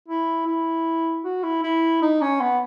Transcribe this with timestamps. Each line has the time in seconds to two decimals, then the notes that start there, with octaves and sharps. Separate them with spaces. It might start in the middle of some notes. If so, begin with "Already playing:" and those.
0.08 E4
0.47 E4
1.24 F#4
1.43 E4
1.63 E4
2.02 D#4
2.21 C#4
2.41 B3